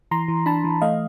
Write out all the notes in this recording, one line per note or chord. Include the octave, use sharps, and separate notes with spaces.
E3 A#5 C6
E3
D4 A5 B5
E3
A3 D#5 F5